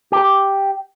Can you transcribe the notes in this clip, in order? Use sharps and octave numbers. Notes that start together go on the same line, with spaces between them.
G4